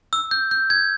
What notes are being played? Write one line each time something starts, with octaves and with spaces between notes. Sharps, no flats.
E6
G6
G6
G#6